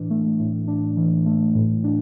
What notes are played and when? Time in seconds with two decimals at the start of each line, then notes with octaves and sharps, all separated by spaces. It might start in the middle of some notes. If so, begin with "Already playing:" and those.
Already playing: A2 E3 D4
0.10 A3
0.40 A2
0.68 D4
0.97 E3
1.26 A3
1.55 A2
1.84 D4